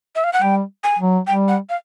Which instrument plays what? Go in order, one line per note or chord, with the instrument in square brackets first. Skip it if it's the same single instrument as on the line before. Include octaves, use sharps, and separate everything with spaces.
[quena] E5
F5
F#5
[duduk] G3 [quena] G5
[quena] G#5
[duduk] F#3
[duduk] G3 [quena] G5
[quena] F#5
F5